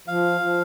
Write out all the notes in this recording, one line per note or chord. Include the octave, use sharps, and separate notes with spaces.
F3 F5
F3